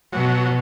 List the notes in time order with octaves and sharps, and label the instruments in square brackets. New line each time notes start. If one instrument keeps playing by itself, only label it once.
[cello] B2 [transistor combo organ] F#3